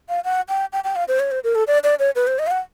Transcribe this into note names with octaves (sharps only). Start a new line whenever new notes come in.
F5
F#5
G5
G5
G5
F5
C5
C#5
C5
A#4
A4
D5
D5
C#5
B4
C5
D#5
F5
F#5